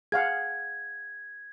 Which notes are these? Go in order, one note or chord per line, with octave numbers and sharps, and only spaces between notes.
G#4 F5 F#5 G#6